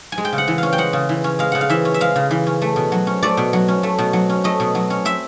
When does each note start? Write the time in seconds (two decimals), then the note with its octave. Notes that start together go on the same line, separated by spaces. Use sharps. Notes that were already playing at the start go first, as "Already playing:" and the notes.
0.12 G#5
0.18 G#3
0.25 G5
0.33 C#3
0.38 F#5
0.48 E3
0.58 C#4 F5
0.73 G5
0.78 G#3 F#5
0.93 C#3
1.09 E3
1.24 C#4
1.39 G#3 F5
1.52 C#3 F#5
1.61 F5
1.70 E3 E5
1.85 C#4
1.94 E5
2.00 G#3 F5
2.16 C#3
2.31 E3
2.47 C#4
2.62 A3
2.76 B2
2.92 F#3
3.07 C#4
3.23 A3 D5
3.37 B2
3.53 F#3
3.68 C#4
3.83 A3
3.98 B2
4.13 F#3
4.29 C#4
4.44 A3 D#5
4.60 B2
4.75 F#3
4.90 C#4
5.05 C4 E5